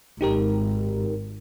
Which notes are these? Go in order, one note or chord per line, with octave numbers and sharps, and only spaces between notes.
G#1 D#4 G4 A#4